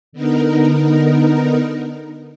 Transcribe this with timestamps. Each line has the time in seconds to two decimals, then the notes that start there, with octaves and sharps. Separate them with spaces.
0.13 D3 B3 D#4 A#4